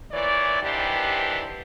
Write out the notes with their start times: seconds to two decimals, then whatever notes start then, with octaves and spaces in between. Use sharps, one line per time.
0.12 A#2 E3 C#5 D5
0.62 D#3 E3 B3 D4 G4 C5